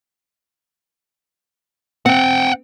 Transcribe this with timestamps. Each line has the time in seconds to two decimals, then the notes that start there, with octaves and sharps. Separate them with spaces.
2.06 C4 F#5 G5